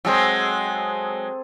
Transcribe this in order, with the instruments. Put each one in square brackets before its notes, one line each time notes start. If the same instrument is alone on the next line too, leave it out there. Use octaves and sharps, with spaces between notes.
[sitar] F#3 G#3 [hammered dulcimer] C4 G#4 A4